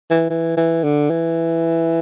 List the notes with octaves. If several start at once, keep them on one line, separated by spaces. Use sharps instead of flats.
E3
E3
E3
D3
E3